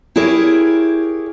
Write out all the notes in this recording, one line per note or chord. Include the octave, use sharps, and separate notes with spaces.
E4 G4 G#4 A#4 C#5